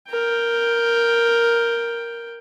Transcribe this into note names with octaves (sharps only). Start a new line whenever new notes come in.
A#4 G5